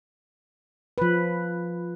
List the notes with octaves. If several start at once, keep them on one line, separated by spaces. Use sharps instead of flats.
F3 B4